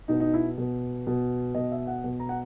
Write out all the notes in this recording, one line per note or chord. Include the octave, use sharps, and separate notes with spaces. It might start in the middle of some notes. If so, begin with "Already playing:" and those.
B2 D#4
D#4
E4
B2
B2
B2 D#5
E5
F#5
B2
A#5
F#5